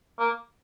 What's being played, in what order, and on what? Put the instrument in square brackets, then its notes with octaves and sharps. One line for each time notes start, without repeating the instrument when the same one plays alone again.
[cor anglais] A#3